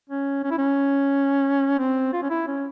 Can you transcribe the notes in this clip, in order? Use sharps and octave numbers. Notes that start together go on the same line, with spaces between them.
C#4
C#4
E4
C#4
C4
F4
C#4
E4
C#4